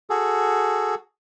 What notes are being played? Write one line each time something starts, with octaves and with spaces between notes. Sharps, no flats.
F#4 G#4 A4